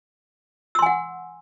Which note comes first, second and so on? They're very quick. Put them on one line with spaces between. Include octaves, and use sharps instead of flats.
E6 C6 G#5 F#5